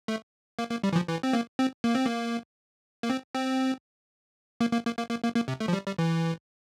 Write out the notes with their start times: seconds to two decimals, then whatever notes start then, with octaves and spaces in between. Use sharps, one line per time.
0.08 A3
0.59 A#3
0.71 A#3
0.84 G3
0.93 E3
0.96 F3
1.09 E3
1.23 C4
1.33 A#3
1.59 C4
1.84 A#3
1.95 C4
2.06 A#3
3.03 A#3
3.10 C4
3.35 C4
4.61 A#3
4.73 A#3
4.85 A#3
4.98 A#3
5.10 A#3
5.23 A#3
5.35 A#3
5.48 C3
5.60 A3
5.68 F3
5.73 G3
5.86 G3
5.98 E3